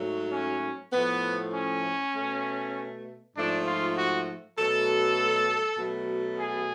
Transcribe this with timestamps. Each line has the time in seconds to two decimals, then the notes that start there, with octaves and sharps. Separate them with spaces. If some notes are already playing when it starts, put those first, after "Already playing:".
Already playing: G#2 F#3 A3
0.32 C#4
0.93 A2 F3 A3 B3
1.54 C#4
2.15 B2 A3
3.36 G#2 F3 A3 D4
3.66 F4
3.97 F#4
4.57 B2 F#3 A3 A4
5.79 B2 F#3 A3
6.40 G#4